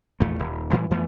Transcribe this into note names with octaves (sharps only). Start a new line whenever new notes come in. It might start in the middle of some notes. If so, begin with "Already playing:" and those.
A#1 E2 A3
D#1
A2 E3 G3 G#3
F2 E3 A3 B3